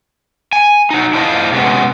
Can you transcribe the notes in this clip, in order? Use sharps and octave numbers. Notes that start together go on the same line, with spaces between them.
G#5
F#3 D#4
D4 E4 F4 C5 D5 D#5
C3 G#3 B3 C#4 F#4